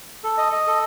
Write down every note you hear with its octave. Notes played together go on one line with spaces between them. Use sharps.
A4
D#5
D#5
A4